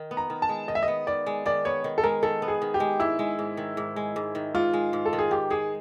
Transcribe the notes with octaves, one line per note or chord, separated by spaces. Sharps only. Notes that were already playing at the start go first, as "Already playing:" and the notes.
Already playing: D#3
B3
A#5
D#3
A5
G#3
D#3 D#5
E5
D#5
B3
D#3 D5
G#3
D#3 D5
B3 C#5
D#3
A4
G#3 A#4
D#3 A4
B3
G#4
D#3
G4
G#3
G#2 E4
G#3
G#2
D#3
G#2
G#3
G#2
D#3
G#2 F4
G#3
G#2
A4
D#3
G#4
G#2 G4
G#3 G#4